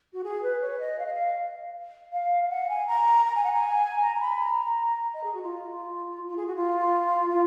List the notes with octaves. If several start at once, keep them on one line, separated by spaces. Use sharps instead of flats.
F#4
G#4
B4
C#5
D#5
F5
D#5
F5
F5
F5
F#5
G#5
A#5
A#5
G#5
F#5
G#5
A#5
A#5
B5
A#5
D#5
G#4
F#4
F4
F4
G#4
F#4
F4
F4